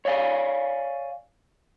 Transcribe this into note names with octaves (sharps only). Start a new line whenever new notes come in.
C#5 D5 F5 G5 G#5